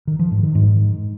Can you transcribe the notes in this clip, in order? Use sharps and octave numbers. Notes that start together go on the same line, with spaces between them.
D#3
F3
G#2
D#3
G#2